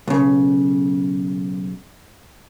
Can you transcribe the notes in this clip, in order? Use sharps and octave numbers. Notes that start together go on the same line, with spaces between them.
B1 C#3